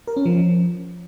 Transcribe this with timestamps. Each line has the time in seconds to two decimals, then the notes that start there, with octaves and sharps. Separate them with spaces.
0.07 A#4
0.17 C#4
0.26 F3